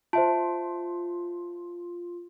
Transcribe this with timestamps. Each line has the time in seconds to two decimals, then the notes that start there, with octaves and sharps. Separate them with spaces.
0.13 F4 C5 E5 A5